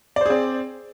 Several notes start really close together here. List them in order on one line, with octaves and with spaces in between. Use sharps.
D5 C5 G#4 C4